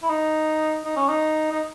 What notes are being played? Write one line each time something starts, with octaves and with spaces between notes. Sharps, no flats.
E4
D#4
D#4
C#4
D#4
D#4